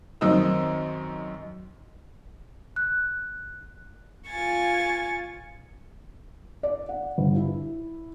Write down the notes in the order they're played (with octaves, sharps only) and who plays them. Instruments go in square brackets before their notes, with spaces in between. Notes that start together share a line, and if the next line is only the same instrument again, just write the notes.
[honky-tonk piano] F#2 D#3 C4 D#4 D#5 E6
[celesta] F#6
[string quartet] F4 G#5 C#6 A6
[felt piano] D5
F#5
G1
E4